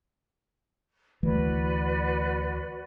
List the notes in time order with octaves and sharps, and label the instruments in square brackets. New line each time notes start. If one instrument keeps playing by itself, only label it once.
[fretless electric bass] D2 E3 A3 [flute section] F#4 B4 D5